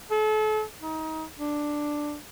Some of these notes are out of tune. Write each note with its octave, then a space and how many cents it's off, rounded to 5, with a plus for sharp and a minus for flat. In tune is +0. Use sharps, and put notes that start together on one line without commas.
A4 -35
D#4 +30
D4 +5